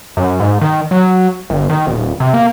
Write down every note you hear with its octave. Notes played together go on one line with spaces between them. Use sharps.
F#2
G#2
D#3
F#3
G1
D#3
D#1
C3
A#3